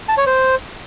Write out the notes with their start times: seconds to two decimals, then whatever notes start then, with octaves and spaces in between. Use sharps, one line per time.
0.09 A5
0.18 C#5
0.27 C5